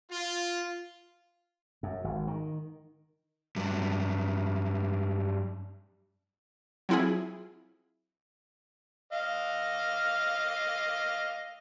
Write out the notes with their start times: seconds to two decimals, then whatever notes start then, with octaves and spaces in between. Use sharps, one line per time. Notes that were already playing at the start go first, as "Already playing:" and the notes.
0.11 F4
1.83 F#2
2.04 G#1
2.27 D#3
3.56 G2 F#3
6.89 F#3 C4 E4 F4 G#4
9.13 D#5 F5